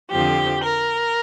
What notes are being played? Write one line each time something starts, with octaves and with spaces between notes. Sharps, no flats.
F2 D3 F3 C4 G4
A#4